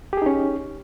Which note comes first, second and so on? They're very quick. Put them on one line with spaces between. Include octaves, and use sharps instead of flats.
G4 G#4 D#4 C#4